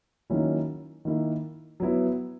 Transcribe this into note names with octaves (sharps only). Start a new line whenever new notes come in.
D#3 F#3 A#3 C#4 E4
D#3 A#3 E4
F#3 B3 E4